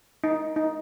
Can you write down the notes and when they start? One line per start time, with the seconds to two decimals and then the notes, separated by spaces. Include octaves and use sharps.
0.24 D#4
0.56 D#4